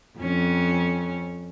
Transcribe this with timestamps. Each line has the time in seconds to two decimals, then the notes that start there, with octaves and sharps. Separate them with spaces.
0.19 F2 C#4